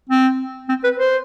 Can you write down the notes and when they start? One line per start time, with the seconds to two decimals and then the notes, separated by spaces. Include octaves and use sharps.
0.09 C4
0.69 C4
0.84 B4
0.99 C5